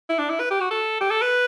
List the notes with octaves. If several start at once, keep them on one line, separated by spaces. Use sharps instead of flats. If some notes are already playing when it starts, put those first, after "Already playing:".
E4
D4
E4
B4
G4
F#4
A4
G4
A4
B4